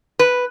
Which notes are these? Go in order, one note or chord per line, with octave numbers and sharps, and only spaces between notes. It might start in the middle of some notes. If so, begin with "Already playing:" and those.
B4